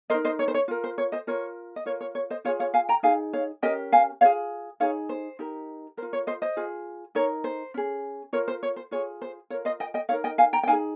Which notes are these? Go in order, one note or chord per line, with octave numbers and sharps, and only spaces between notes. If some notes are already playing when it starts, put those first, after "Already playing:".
D#4 A#4 C5 D#5
C5 D#5
C#5
C5
C#5
F4 A#4
C5
C#5
C5 D#5
F4 A#4 C#5
D#5
F4 A#4 C#5
C#5
C#5
C5 D#5
F4 G#4 C#5 F5
C#5 F5
F5 G#5
G5 A#5
D#4 G#4 F5 G#5
C#5 F5
C#4 G4 A#4 D#5 G5
F5 G#5
F4 G#4 C#5 F5
D#4 G#4 C#5 F5
C5
D#4 G4 A#4
F4 A#4 C5
C#5
C5 D#5
C5 D#5
F4 G#4
D#4 A#4 C#5
C5
C#4 G#4
F4 A#4 C#5
C5
C#5
C5
F4 G#4 C#5
C5
F4 A#4 C#5
C5 D#5
D#5 G5
D#5 G5
D#4 A#4 C#5 F5
D#5 G5
F5 G#5
G5 A#5
G5
D#4 G#4 F5 G#5